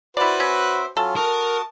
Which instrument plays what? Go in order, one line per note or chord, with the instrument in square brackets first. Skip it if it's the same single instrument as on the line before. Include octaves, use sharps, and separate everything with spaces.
[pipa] E4 D5 [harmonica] F#4 B4 C5
[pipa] C#4 [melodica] E5 D6
[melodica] F#3 C#4 F4 [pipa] A4
[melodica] F#4 D#6 [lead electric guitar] A#4 A#5 [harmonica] A5